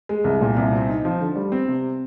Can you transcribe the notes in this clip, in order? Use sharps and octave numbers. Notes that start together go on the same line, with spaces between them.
G#3
C2
A#2
C2
C4
D#4
F3
D3
G3
C4
C3